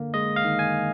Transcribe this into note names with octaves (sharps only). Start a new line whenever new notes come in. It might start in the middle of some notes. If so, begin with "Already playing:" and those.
Already playing: D3 A#3
G#3 D#5
F5
D#3
G#5